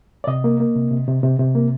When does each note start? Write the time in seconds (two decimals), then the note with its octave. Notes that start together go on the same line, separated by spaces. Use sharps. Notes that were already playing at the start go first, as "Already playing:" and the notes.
0.24 D5
0.27 C3 D#5
0.44 A#3
0.60 A#3
0.75 C3
0.91 C3
1.07 C3
1.23 C3
1.39 C3
1.55 A#3